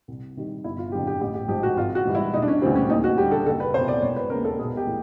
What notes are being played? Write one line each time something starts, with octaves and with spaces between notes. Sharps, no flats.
C2
C3 D#3 G3
G1 E4
F4
F2 D3 F#3 G4
G4
A1 G4
G4
G#2 F3 G4
F#4
G#1 F4
F#4
G#2 E3 G3
E4
E1 D#4
D4
C#4
D2 C#3 E3 G3 C4
C#4
D#2 D#4
F#4
D3 G3 G4
A4
F#1 A4
B4
E2 C3 C5
D5
E1 C#5
B4
D#2 C#3 A#4
A4
B1 G#4
G4
A2 E3